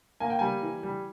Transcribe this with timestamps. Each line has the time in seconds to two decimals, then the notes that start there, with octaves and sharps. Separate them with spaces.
0.20 A#3 G#5
0.30 G5
0.39 G3 G#5
0.62 E3
0.83 G3